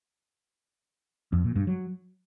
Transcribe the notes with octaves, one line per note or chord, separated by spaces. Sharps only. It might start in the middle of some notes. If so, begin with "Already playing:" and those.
F2
A#2
G2
F#3